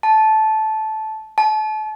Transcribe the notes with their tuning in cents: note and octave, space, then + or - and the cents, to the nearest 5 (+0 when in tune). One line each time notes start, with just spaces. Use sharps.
A5 -15
A5 -35